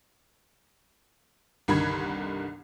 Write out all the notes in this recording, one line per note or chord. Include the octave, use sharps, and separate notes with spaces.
G1 C2 D3 D#3 B5 G#6